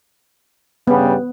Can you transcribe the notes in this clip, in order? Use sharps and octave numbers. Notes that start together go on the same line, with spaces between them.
G2 C#3 G3 B3